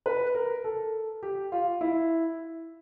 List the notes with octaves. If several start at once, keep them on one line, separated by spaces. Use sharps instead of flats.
B4
A#4
A4
G4
F4
E4